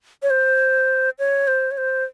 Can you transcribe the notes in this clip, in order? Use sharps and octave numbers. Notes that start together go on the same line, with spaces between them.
C#5
C5
C#5
C5
C#5
C5